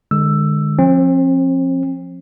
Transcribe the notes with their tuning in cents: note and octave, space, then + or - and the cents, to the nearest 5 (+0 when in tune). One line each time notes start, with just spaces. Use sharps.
D3 +35 G#3 -5 E6 +10
F3 +5 C4 +40